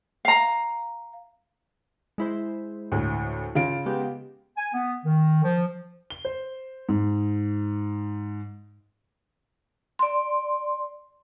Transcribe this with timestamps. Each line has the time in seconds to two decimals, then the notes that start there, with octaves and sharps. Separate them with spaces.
0.25 F5 A#5
2.18 G#3 E4 C5
2.92 D2 A2
3.55 C#3 F4 D7
3.86 G#3 B3 G4
4.57 G#5
4.74 B3
5.05 D#3
5.44 F3
6.10 G7
6.25 C5
6.89 G#2
9.99 D5 C6